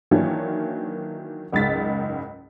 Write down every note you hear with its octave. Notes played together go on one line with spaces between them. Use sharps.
D#3 E3 F#3 A#3 D4 C#5
F#1 C#2 G#2 A6 B6